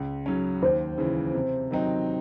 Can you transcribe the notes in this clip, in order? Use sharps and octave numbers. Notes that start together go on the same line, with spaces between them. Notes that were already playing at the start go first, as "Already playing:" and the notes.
Already playing: C#2
C#3 F#3 C#4
D#2 C5
C#3 E3
C3
D#3 F#3 C4 D#4